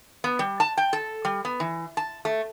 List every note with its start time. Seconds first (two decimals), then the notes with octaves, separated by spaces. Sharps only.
0.24 B3
0.39 G3
0.60 A5
0.77 G5
0.93 A4
1.25 G3
1.45 B3
1.60 E3
1.97 A5
2.25 A3